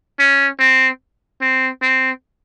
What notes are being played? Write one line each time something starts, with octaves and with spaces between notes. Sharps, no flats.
C#4
C4
C4
C4